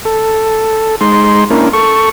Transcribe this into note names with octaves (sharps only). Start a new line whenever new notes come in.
A4
G#3 D#4 C6
A#3 C#4 D4 E4 A#4
A4 C#6